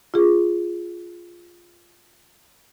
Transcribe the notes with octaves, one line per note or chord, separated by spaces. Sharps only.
F4 G#4